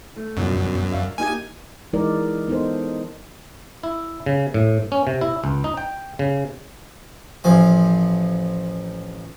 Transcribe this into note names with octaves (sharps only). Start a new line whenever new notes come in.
A3
G1 F#2 B2
D5 E5 F5
A#3 D#4 G4 G#5
E3 G#3 D#4 A#4 D5
B3 D#4 A4 C5
E4
C#3
A2
C#4
C3
E4
C#2
D#4
G5
C#3
A1 F3 G#5